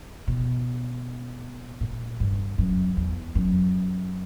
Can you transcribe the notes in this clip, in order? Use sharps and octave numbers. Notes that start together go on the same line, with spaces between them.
B2
A#2
G2
F#2
E2
F#2